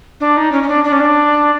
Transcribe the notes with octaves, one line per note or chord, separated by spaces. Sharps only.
D4
D#4
C#4
C#4
D4
D4
C#4
D4